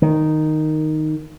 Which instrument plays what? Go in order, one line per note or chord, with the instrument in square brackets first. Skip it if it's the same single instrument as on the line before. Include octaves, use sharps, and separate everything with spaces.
[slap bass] D#3